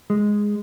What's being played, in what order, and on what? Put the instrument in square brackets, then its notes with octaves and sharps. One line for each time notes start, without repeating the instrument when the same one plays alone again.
[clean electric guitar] G#3